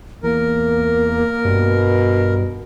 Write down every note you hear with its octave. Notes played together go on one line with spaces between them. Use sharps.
E2 A#3 A#4
G2 B2